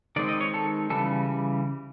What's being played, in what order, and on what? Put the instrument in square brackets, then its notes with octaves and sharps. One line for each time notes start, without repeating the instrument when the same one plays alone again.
[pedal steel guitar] D#3 G#3 C4 D5
D#5
C#5
A4
C#3 E3 G3 A4